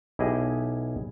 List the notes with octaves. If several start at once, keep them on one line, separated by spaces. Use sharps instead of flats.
B1 E4 G4 G#4 D#5